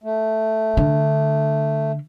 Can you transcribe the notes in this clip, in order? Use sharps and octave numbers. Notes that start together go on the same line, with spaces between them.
A3
D3